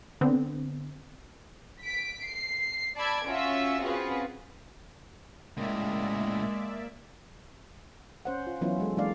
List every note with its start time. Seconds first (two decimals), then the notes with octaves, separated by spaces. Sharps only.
0.21 D3 B3 C4
1.82 B6 D7
2.25 C7
2.97 D5 A5 B5 E6 G#6 D7
3.28 C#4 F4 F#4 E5 E6
3.82 C4 C#4 F4 F#4 G#4 B4
5.57 A2 C#3 G#3 A#3 D5 E5
8.25 C#4 C5 F#5
8.47 F4
8.61 E3 F#3 B3 C#4 E4 F4
8.80 G#3 A4
8.97 E3 G#3 A#3 D4 D5 F5